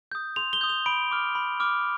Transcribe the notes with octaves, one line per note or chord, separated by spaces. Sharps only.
D#6 G6
C6 F7
G7
D#6 G6
F7
B5 D7
D6 F6
B5
D6 F6